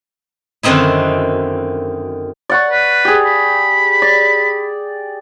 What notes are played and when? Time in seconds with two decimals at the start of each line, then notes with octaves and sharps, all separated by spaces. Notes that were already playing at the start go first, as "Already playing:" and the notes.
0.63 F#2 D3 D#3 C4 D#4 E4
2.49 D5 F#5 C#6
2.70 B4
3.05 G4 G#4
3.25 B5
4.02 D5